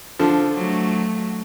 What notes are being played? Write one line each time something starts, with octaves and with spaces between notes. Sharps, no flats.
D3 F3
F#3 A3